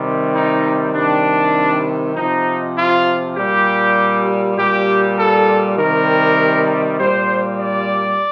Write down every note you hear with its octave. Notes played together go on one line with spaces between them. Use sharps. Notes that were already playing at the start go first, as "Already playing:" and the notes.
Already playing: C3 D#3 G3
D#4
C3 D#3 G3 D4
C3 F3 D#4
F4
A#2 G3 G4
A#2 G3 G4
A4
C3 D#3 G3 A#4
A#2 G3 C5
D5